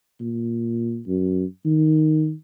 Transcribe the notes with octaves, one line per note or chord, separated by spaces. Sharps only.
A#2
F#2
D#3